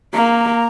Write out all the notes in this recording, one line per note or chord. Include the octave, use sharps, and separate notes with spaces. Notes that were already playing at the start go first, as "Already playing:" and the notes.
A#3 A#5